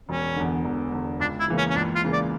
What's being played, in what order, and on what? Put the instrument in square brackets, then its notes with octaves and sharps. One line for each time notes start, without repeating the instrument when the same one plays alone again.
[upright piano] E1 [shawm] C#4
[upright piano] E2 D3
E1
E2 D3
[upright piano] C#2 [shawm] D4
[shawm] E4
[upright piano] C#3 E3 A#3
[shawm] C#4
C#4
[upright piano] C#2 [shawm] D4
[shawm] F4
[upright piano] C#3 E3 A#3
[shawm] D5